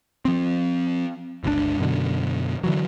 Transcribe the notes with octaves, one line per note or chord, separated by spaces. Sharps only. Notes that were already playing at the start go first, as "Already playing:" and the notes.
F3 C4
G1 C#2 B2 D4
F#2 B2 D3
D3 E3 F#3